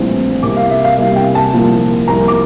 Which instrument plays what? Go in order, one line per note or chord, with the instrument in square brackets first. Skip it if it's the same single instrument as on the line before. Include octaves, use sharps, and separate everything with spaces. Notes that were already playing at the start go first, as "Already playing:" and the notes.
Already playing: [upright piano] A#1 A2 E3 G3 C4
C2 C3 G3 A#3 D6
F5
E5
F5
C2 C3 G3 A#3 F5
G5
A5
C2 A#2 F3 A#3
C2 A#2 F3 A#3 A#5
D6